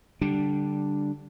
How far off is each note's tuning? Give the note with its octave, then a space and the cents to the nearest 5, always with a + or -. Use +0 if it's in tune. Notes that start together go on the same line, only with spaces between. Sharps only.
D3 -10 G3 +0 D4 +0